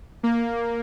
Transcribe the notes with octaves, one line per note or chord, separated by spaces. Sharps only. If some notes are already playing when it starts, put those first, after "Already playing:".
A#3